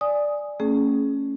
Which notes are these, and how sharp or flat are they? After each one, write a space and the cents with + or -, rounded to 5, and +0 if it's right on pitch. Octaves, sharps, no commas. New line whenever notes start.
D5 +0 G#5 +0 D#6 +0
A3 +35 C#4 +0 G#4 +25